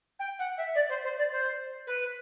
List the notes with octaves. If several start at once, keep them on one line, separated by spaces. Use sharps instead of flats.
G5
F#5
E5
D5
C5
C5
D5
C5
B4